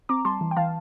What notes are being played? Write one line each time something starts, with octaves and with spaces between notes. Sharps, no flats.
C4 A#5 D6
G3 A5 C6
E3
G5
E3 F5 A5